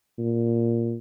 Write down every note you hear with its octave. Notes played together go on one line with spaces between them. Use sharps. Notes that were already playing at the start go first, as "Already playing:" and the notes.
A#2